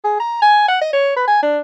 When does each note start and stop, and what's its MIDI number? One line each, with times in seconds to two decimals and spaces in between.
0.04 0.16 68
0.20 0.41 82
0.42 0.67 80
0.68 0.77 78
0.81 0.92 75
0.93 1.13 73
1.16 1.25 71
1.28 1.39 80
1.43 1.59 62